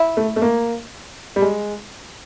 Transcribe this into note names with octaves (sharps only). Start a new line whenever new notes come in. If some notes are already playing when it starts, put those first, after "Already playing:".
Already playing: E4
A3
A3
A#3
G3
G#3